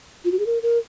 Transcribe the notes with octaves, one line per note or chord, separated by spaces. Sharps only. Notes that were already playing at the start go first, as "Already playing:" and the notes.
F4
F#4
G#4
A#4
A#4